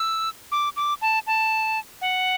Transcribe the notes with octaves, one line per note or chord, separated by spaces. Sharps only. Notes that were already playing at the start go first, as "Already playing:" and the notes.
Already playing: E6
D6
D6
A5
A5
F#5